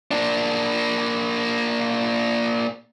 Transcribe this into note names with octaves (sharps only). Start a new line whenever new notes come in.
A#3 D4